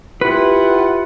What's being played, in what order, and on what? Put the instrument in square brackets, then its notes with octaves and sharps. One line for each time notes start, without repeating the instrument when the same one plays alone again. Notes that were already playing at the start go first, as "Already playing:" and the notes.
[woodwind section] E4 F4 F#5 [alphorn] G4 [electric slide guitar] B4